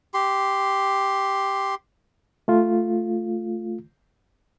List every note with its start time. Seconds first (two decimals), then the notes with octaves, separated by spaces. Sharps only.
0.14 G4 C6
2.48 A3 F4